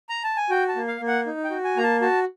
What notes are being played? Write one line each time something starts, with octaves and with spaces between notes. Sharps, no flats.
A#5
A5
G#5
F#4 G5
A5
A#3
F5
A#3
F#5
D#4
G5
F#4
G#5
A#3 A#5
A5
F#4 A5